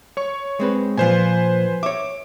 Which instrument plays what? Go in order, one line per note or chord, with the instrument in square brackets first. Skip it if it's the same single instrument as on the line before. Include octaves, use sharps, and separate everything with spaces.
[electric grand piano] C#5 C#6
[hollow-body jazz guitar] G#3 C4 B4
[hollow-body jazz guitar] A#2 F3 [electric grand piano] B4 C5 G#5
[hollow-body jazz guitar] C#5 E5 [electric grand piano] D6